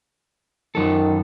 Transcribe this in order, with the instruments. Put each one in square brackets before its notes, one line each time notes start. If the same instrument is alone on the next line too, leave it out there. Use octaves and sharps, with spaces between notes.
[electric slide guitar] F#2 A4 [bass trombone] D#3